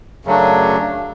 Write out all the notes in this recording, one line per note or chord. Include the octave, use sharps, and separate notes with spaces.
F#2 C#3 F#3 A3 D4